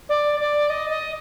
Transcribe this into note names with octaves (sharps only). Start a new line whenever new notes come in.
D5
D5
D#5
D#5